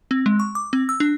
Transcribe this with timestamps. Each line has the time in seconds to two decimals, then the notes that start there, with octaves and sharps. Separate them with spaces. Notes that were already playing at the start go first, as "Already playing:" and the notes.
0.11 C4
0.26 G#3
0.40 C#6
0.55 D6
0.73 C4
0.89 E6
1.00 D4